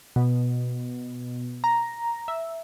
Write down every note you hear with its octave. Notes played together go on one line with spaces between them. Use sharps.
B2
A#5
E5